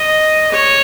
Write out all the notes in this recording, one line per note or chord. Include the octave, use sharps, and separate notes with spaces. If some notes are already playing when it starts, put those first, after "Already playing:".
Already playing: D#5
C#5